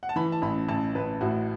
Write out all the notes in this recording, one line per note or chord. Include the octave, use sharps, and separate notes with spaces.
F#5
A5
E3 B5
A5
A1 B5
A1 A5
A1 B4
A2 F#4